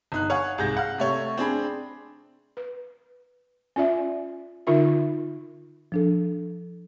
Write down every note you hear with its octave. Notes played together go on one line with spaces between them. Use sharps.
G1 D#4 F#6
C#5 F5 F#5 G#5
C2 G#2 G#4 G6 A#6
F5 F#5
C3 A3 C#5
C4 D4 G#4 B5
B4
C#4 F4 D5 E5
D3 D#4 F4 A#4 E5
F3 D4 A4